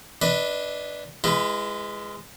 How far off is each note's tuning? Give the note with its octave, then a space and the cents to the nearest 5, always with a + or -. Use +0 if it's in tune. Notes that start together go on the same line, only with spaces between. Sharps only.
D4 +0 B4 +0 D#5 +30
G#3 -5 E4 +40 B4 +0